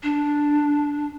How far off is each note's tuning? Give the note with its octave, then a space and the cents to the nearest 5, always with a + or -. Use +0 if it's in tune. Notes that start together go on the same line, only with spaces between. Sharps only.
D4 -5